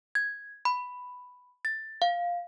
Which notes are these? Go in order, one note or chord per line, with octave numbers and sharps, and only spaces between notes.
G#6
B5
A6
F5